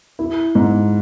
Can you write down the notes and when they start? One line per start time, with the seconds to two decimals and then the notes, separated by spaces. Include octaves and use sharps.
0.19 E4
0.55 G#2